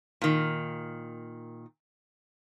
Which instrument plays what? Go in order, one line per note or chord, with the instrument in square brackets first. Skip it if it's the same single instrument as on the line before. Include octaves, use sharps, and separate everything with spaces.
[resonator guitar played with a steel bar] A#2 D#3